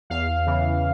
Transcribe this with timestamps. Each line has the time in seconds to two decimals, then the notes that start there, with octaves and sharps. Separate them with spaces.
0.10 E2 F5
0.46 C#3 E3